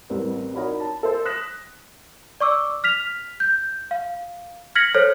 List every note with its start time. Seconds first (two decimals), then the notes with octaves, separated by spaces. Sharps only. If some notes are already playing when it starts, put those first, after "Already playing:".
0.10 A1 G3 C4 A#4 B4
0.55 D#4 F#4 A#4 C#5 D5 B5
0.80 A5
1.03 A4 C5
1.25 D#6 F#6 A#6 B6 E7
2.40 D5 C#6 D6 E6
2.84 F6 B6 F7
3.40 G6
3.91 F5
4.75 F6 G#6 A#6 B6 C#7 F#7
4.94 A4 C5 C#5 F6